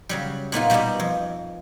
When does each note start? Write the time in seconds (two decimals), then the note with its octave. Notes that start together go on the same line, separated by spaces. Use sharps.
0.09 C#3 F#3 G3
0.52 A#2 B3 D#4 F4
0.70 B2 G3 B3 D#4 G4
1.00 F2